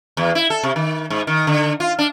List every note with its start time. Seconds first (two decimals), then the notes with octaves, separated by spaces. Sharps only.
0.17 E2
0.35 E4
0.50 A4
0.63 C3
0.76 D#3
1.10 G#2
1.27 D#3
1.47 D3
1.80 F4
1.99 D4